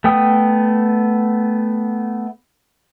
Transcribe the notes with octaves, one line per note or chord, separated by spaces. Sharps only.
A3 B3 G5 D#6